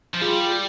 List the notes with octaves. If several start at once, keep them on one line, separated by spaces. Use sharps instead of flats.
F3
G3 F4 G#4